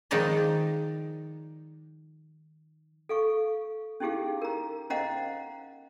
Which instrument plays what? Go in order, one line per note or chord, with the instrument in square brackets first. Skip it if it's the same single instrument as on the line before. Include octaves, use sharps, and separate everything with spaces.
[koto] D#3 F3 G#3 D#4 D5 D#5
[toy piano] A4 F5 C#6
C#4 D#4 E4 G4 G#4 F5
A#4 A#5
C#4 C5 D#5 F5 F#5 A#5